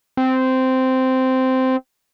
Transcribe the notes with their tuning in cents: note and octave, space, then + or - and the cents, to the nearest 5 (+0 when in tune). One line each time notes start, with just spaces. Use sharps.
C4 -10